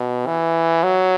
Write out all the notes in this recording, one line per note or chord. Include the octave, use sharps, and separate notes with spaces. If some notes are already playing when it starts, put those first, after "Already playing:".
Already playing: B2
E3
F#3